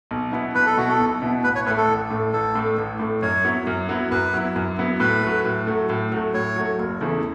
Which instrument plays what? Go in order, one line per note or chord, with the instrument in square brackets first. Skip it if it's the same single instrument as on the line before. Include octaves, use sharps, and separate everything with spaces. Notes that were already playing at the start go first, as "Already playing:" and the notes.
[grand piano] B1
B2 B3 E4
[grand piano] B1 [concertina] B4
[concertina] A4
[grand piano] B2 B3 E4 [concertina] F#4
[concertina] A4
[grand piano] B1
B2 B3 E4
[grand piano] A1 [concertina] B4
[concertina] C#5
[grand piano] A2 A3 [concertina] B4
[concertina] A4
[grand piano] A1
A2 A3
[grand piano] A1 [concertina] A4
[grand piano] A2 A3
A1
A2 A3
[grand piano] F#2 [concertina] C#5
[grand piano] F#3 B3 E4
F#2
F#3 B3 E4
[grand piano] F#2 [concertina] B4
[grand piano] F#3 B3 E4
F#2
F#3 B3 E4
[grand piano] A2 [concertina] B4
[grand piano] F#3 A3
A2
F#3 A3
A2
F#3 A3
[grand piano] A2 [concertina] C#5
[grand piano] F#3 A3
F#1
E2 C#3 A3 E4